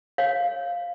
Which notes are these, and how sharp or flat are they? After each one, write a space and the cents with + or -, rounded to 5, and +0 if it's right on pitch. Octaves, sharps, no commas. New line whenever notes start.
C#5 -30 F5 +0